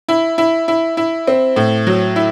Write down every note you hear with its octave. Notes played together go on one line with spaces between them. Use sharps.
E4
E4
E4
E4
C4
A2
F#3
E4